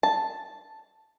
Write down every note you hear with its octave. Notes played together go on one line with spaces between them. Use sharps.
A5